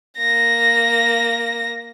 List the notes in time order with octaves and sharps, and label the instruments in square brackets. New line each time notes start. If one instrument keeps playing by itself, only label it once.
[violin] A#3 A#6